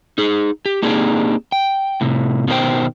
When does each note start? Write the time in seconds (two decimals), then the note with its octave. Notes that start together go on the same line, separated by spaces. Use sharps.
0.18 D#4 G#4
0.66 G4
0.82 A#3 C4 D4 D#4 G4 G#4
1.52 G5
2.01 A2 C3
2.48 B2 D#3 E4 C5 G5